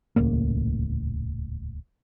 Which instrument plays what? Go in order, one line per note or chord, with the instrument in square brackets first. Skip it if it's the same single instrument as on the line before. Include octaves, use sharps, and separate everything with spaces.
[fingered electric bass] D#1 C#2 A2 A#3